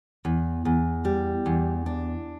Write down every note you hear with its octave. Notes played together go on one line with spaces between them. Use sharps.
E2
E2
G3
E2
D4